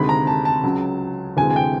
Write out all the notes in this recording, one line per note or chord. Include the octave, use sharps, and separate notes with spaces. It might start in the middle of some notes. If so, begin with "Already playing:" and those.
Already playing: D2 C3 D#3 G#3 B5
A#5
A5
A5
C#2 C#3 F#3
D2 C3 E3 G#3 G#5
G#5
G5